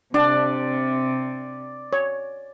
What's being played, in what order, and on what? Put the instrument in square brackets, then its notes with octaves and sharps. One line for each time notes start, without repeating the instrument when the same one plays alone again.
[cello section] C3 [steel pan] D4 [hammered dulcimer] D5
[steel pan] C#5